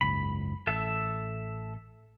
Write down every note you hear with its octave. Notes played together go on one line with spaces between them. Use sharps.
F#1 C#2 G#2 B5
A1 A4 E5